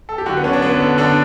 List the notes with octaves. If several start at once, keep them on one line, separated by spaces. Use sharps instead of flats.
A4
G4
D3 F#4
B3
D3 C#4
D4
D3 B3
D3
D3 D4